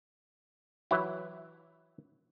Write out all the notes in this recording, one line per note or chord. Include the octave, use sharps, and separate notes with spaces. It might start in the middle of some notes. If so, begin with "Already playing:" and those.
E3 F#3 E4